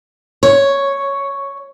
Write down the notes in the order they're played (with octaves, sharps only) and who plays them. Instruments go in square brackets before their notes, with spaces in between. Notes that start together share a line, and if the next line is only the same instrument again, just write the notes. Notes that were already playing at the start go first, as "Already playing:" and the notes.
[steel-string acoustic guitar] C#5